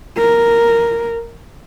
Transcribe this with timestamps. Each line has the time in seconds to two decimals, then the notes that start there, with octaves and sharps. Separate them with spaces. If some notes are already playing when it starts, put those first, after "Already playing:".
0.17 A#4